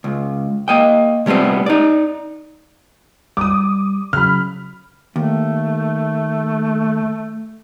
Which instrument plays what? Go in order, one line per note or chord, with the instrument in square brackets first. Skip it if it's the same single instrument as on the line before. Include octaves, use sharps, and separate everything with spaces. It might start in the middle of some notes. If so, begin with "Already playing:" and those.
[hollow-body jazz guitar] C#2
A#3 D#5 G5
C3 G3 A3 B3 C4
D#4 D5
[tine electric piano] G3 [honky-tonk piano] D6 D#6
[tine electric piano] C#3 F#3 [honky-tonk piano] B5 F6
[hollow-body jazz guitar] D#2 [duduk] A3